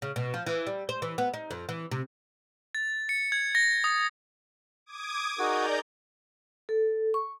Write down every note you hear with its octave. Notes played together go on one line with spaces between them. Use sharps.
C#3
B2
F3
E3
G3
C5
E3
B3
D#4
F2
E3
C3
A6
C#7
G#6
A#6
D#6
D6 D#6 G#6
D#4 F#4 G#4 A#4 D5 A#5 G6
A4
C#6